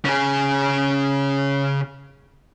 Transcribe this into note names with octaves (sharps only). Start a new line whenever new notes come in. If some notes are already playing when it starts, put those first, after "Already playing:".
C#3 G#4